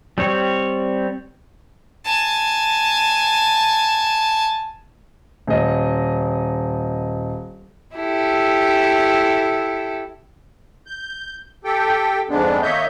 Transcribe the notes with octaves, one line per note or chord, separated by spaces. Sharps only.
G3 C4 C#5
G#5 A5
D#1 D#5
E4 G4 A4
G6
G4 A4 G5
F2 G#2 G#3 B3 D4
D#3 A#3 C#5 D#5 E5 G6